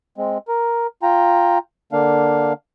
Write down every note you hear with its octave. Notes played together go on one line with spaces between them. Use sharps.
G#3 C4
A#4
F4 G5 A#5
D3 A#3 D4 F5